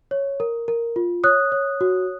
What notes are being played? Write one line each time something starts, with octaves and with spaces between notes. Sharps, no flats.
C#5
A#4
A#4
F4
C#5 D#6 F#6
C#5
F#4